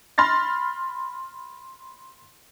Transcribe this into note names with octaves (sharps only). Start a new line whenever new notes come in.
B5 C6 F6 A6 A#6